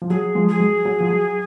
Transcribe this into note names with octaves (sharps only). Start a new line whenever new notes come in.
F3
F#3 G#4
F3 G#3
G#4
F#3
F#3
F3
F#3